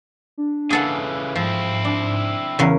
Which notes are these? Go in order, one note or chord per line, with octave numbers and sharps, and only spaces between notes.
D4
C#3 E3 G#4 A4 F#5
G#2 F3 C4 E4
D4
E2 C#3 A#4 F#5